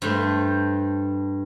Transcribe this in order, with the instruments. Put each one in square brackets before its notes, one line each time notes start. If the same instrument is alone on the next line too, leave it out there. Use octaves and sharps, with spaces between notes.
[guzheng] G2 A3 C5 C6